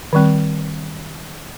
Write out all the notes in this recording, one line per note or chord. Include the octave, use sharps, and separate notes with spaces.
D#3 G3 C4